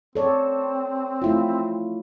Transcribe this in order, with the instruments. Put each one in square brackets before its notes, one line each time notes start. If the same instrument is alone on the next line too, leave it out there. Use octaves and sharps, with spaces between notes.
[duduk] C4 [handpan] A4 C#5 D5
[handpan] A3 E4 F4